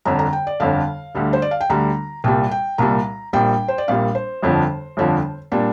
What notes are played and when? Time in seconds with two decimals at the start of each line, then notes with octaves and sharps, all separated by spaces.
0.05 G1 F2 D3 A#5
0.19 A#5
0.33 G5
0.47 D5
0.60 G1 F2 D3 F5
1.15 D2 D3 G3
1.33 C5
1.42 D5
1.51 F5
1.61 G5
1.70 D2 D3 G3 A#5
2.24 C2 A#2 G3 G5
2.51 G5
2.78 C2 A#2 G3 A#5
3.33 A#1 A#2 G3 G5
3.68 C5
3.78 D5
3.88 A#1 A#2 G3 F5
4.15 C5
4.42 G1 F2 D3 F3
4.97 G1 F2 D3 F3
5.52 A#2 G3 D4